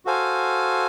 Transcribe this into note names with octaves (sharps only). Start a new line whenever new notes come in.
F#4 A4 C5 F5 G#5